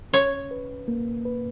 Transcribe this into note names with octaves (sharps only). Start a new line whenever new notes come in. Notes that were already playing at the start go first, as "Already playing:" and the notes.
C#4 C#5
B4
A#3
B4